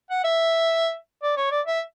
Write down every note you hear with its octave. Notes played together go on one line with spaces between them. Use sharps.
F#5
E5
D5
C#5
D5
E5